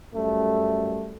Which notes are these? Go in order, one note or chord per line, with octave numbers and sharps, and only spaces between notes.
F#2 G3 A3